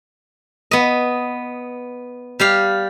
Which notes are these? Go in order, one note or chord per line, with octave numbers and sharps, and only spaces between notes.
B3 D#5
G3 G4 F5